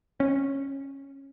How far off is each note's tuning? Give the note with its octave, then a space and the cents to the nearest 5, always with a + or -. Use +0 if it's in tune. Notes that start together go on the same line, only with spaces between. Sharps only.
C#4 -15